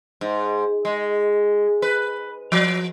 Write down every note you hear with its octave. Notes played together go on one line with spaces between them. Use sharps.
G#2
G#3
B4
F3